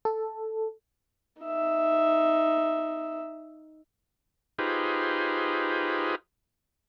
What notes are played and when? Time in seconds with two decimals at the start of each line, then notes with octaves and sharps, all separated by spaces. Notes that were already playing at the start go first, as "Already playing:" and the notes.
0.05 A4
1.42 D#4 E5
4.59 D#4 F4 G4 G#4 B4 C5